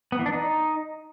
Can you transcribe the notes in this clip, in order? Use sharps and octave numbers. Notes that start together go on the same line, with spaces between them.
B3
E3
D4
D#4